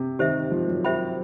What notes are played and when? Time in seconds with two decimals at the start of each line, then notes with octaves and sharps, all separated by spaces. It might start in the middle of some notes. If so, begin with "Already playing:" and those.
Already playing: C3
0.19 D#3 G4 C5 E5
0.51 F3
0.68 F#3
0.84 G4 C5 E5 G5 B5